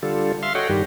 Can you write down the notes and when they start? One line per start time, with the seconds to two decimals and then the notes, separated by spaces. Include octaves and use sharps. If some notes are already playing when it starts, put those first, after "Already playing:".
0.03 D3 G3 F4 A4
0.43 E5 F5 C6 F6
0.55 F#4 A4 C#5 D#5 F#5 G5
0.69 G2 D#3 G3 G4